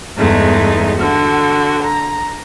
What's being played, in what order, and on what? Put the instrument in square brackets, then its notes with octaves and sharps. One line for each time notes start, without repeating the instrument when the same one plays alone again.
[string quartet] E2 G2 G#3 A3 D#4
D3 F#4
A#5